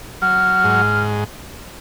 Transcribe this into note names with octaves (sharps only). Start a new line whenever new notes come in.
F#3 F6
G#2